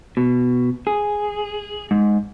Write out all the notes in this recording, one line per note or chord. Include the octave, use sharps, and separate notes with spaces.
B2
G#4
G#2